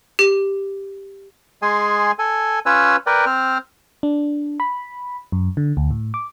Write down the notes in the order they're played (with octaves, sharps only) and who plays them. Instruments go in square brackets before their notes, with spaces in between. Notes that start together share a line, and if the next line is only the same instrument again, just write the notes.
[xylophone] G4
[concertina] G#3 G#4 G#5 C6
A4 G#5
C#4 F4 B4 C#5 G#5 E6
A#4 B4 D5 G5
C4 C5 F6
[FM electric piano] D4
B5
F#2
D3
D2
A2
D6